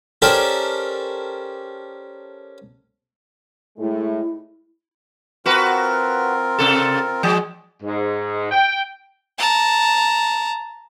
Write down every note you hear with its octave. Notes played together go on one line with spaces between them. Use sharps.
C#4 G4 A4 A#4 C5 D5
A2 G#3 A3 E4
C4 F4 F#4 A#4 B4
C3 A4
F3 G#3 G#4
G#2
G5
A5 A#5